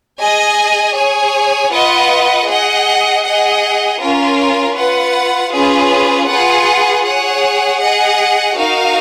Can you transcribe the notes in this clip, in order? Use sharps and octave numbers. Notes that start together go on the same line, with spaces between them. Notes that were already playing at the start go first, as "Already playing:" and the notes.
G#4 D#5 G#5
G#4 C#5 G#5
F4 B4 D#5 F#5
G#4 D#5 F#5
G#4 D#5 F#5
C#4 F4 A#4
F4 B4 F#5
C#4 F4 G#4 B4
F4 G#4 B4 F#5
G#4 C#5 F#5
G#4 D#5 F#5
D#4 F#4 A#4 F5